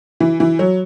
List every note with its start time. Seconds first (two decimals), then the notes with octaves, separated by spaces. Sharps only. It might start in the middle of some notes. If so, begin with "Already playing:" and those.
0.20 E3
0.40 E3
0.59 F#3